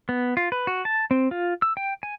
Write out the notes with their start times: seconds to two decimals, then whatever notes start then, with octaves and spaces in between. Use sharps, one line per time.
0.09 B3
0.37 F4
0.52 B4
0.67 F#4
0.85 A5
1.11 C4
1.31 F4
1.62 E6
1.77 G5
2.03 G#5